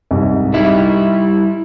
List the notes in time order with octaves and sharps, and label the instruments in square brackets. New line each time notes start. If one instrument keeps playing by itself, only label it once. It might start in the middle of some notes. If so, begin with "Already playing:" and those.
[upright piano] C2 G#2
[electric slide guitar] G3 E4 [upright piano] D#4